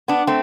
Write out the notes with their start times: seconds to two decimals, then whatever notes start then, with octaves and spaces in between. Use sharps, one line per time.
0.08 B3 D4
0.27 A3 C4